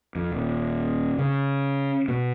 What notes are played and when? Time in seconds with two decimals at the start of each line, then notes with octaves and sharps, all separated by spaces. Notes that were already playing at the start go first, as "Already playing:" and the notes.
0.15 F2
0.32 D#1
1.18 C#3
2.08 B2